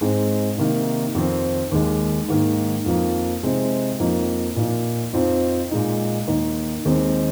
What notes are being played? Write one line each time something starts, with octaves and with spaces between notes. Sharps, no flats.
G#2 G#3 C4 D#4
C3 D#3 A#3 D#4
F2 D#3 C4
D#2 D#3 G#3
G#2 D#3 A#3 D#4
F2 F3 A#3
C3 G#3 C4 D#4
F2 F3 A#3 D#4
A#2 A#3 D#4
F2 F3 C4 D#4
A#2 G#3 D#4
D#2 D#3 A#3 D#4
D#2 D#3 G#3 C4 D#4